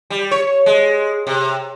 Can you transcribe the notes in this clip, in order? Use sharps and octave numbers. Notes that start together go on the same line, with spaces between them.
G3
C#5
G#3
C3